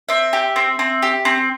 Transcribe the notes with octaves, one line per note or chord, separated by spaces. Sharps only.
C4 E5
G4
C4
C4
G4
C4